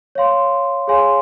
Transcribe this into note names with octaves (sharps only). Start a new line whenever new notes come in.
C#5 F5 C6
G#4 C#5 F5 G#5 C6